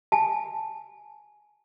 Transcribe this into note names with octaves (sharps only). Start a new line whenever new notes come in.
G#5 A5